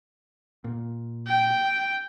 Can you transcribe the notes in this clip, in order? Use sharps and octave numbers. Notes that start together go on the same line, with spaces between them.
A#2
G5